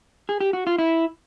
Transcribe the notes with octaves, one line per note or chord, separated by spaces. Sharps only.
G#4
G4
F#4
F4
E4